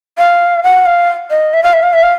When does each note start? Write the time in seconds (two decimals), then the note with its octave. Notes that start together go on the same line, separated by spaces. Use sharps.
0.18 F5
0.63 F#5
0.86 F5
1.31 D#5
1.53 E5
1.63 F5
1.73 E5
1.83 F5
1.93 E5
2.03 F5